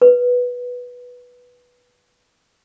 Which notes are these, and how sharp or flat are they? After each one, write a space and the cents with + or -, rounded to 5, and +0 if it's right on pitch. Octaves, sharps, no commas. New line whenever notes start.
B4 -5